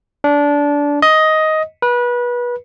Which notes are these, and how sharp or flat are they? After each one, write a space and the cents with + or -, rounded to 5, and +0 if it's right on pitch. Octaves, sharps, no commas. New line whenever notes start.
D4 -20
D#5 +10
B4 -25